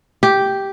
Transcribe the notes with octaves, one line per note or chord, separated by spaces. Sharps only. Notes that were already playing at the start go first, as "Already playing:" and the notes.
G4